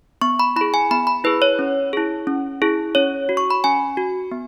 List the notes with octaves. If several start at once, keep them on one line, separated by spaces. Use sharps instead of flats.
B3 C#6
B5
E4 G#4 B5
G#5
B3 B5
B5
E4 G#4 B4
C#5
C#4
E4 G#4
C#4
E4 G#4
C#4 C#5
F#4
C#6
B5
C#4 G#5
F#4
B3